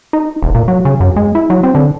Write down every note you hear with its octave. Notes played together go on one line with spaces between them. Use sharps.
D#4
E1
A#2
F#3
C#3
F#2
G#3
E4
F#3
C4
D3